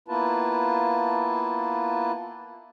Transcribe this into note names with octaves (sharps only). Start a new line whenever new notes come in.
A#3 B3 E4 F4 B4 A5